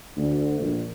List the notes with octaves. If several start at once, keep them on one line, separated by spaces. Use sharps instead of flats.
D2
A#1